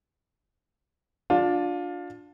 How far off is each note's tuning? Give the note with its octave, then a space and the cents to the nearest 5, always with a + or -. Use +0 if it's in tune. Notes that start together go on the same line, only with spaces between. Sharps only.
D4 +0 F4 +25